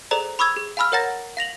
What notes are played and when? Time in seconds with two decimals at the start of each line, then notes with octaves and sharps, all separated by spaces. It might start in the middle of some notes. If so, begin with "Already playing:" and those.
0.11 G#4 A4 C5 D5 A#5
0.39 B5 C#6 D#6 E6 G#6
0.56 G#4
0.77 F5 G#5 B5 E6 F6
0.92 A#4 C#5 F#5 A#5 A6 A#6
1.37 F5 A#6 F7 F#7